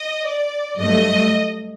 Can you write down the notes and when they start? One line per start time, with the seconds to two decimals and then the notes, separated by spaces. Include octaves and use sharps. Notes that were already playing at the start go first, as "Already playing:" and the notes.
Already playing: D#5
0.26 D5
0.78 G2 F#3 A3 D#5